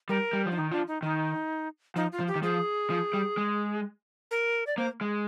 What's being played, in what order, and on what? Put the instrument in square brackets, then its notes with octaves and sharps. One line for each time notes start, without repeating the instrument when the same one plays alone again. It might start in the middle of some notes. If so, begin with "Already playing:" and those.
[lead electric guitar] G3 [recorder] A#4
[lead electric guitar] G3
F3
[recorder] D4
[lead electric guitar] D#3 [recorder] D#4
[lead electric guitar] F3 [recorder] D4
[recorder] D#4
[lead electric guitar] D#3 [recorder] D#4
[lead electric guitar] F3 [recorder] D#4
[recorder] F4
[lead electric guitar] F3
[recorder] G4
[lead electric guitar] D#3
[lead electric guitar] F3 [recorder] G#4
[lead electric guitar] F3
G3
G#3
[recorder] A#4
D5
[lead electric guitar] A#3 [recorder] C5
[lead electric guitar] G#3